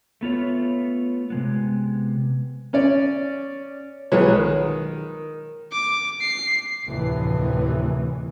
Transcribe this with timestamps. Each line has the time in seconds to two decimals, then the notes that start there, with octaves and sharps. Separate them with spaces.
0.21 A3 B3 F4 C#5
1.30 C3 G#3 B3
2.73 C#4 C#5 D5
4.12 B1 F3 G#3 B4 C#5
4.36 D#3
5.72 D6
6.21 C7
6.86 F1 D2 A2 C3 D#3 E3